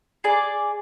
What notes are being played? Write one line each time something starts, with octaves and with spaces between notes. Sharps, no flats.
G#4 D5